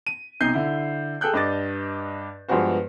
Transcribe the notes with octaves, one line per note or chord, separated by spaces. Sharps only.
D#7
B1 C3 D#4 G6 C7
D3 E4
G#4 A4 G5 F#6 G6
G2 D4 D#5 D6 A6
G2 F3 G#3 B3 F#4 C5